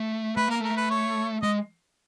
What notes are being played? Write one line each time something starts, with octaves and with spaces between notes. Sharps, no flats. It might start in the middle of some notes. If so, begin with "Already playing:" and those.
Already playing: A3
A3 B4
A#3 A#4
A3 A#4
B4
C#5
G#3 D#5